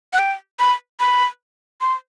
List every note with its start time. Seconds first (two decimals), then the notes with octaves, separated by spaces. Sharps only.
0.13 F#5
0.19 G5
0.59 B5
1.00 B5
1.81 C6